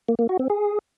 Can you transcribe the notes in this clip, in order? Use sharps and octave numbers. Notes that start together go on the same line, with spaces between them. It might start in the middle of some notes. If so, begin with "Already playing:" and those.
A#3
A#3
F#4
C4
G#4